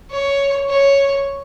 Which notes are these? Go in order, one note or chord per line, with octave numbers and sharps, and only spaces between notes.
C#5
C#5